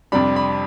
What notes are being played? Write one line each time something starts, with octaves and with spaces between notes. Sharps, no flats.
F2 C3 G3 D4 B5
B5